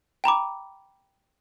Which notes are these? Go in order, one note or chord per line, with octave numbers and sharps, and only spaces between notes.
G5 A#5 B5 D6